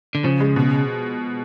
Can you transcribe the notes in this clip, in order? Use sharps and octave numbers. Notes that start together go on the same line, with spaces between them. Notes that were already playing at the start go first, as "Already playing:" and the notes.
D3
C#3 F3
G#3
B2